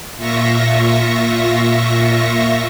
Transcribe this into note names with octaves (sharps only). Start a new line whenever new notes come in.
A#2 F4 E5 C#6 A#6